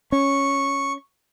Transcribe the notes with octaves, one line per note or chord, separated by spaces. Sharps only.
C#4 C#6